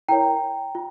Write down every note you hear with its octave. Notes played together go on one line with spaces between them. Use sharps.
E4 A#4 C#5 G5 A#5
F4